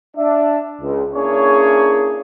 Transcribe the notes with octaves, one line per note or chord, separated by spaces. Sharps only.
D4 E5
C#2
A#3 C#4 D4 E4 G#4 C#5